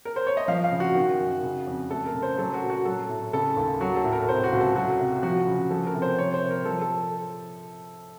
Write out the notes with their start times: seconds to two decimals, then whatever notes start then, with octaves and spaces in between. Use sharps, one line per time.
0.05 A#4
0.16 C5
0.27 C#5
0.37 D#5
0.48 F3 F5
0.64 F5
0.71 C#3
0.80 F#4
0.95 D#3
1.19 F#2
1.43 C#3
1.67 F2
1.91 A3 A4
2.06 A#4
2.14 C#3
2.22 C5
2.38 F#3 A4
2.54 F#4
2.62 A#2
2.70 F#4
2.85 F#3 A4
3.09 A2
3.33 C#3 A4
3.56 D#2
3.81 F#3 F#4
3.96 A4
4.04 A2
4.13 A#4
4.28 C3 C5
4.44 F#4
4.52 C#2
4.60 A4
4.76 F#3 F#4
4.99 C3
5.23 F3 F#4
5.47 C#3
5.71 F3 A4
5.87 A#4
5.94 C3
6.02 C5
6.18 F3 C#5
6.34 C5
6.42 C3
6.50 A#4
6.65 F3 A4
6.81 A4